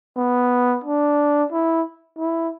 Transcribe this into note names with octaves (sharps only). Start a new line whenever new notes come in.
B3
D4
E4
E4